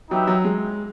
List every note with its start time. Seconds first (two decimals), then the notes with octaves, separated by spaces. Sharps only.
0.10 F#3 D#4 G4 B4 E5 G5
0.27 F#3
0.45 G#3